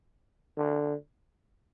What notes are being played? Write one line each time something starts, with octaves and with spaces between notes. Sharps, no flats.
D3